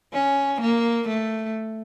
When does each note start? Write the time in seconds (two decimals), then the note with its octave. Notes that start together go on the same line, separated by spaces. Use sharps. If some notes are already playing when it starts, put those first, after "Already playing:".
0.14 C#4
0.61 A#3
1.08 A3